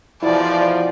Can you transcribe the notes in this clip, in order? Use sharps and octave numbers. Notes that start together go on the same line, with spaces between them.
E2 B2 F3 E4 D5